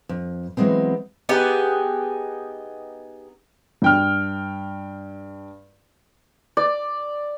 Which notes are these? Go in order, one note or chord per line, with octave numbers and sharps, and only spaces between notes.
F2
E3 F#3 G#3 B3 C4
B3 D#4 G4 G#4
G2 G5 F6
D5